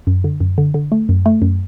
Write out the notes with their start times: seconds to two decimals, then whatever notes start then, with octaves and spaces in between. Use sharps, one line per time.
0.07 F#2
0.24 D3
0.40 F#2
0.58 D3
0.74 D3
0.92 A3
1.09 F#2
1.26 A3
1.42 F#2